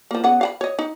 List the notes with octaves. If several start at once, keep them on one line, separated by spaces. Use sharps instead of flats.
F3 A#3
C#3 B3 F#5
F5 F#5 B5
C#5 D#5
D#4